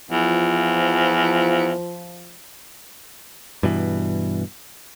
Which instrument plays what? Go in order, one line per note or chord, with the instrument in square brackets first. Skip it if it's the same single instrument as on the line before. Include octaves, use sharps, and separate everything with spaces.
[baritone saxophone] E2 [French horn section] F3
[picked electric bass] G2 B2 E3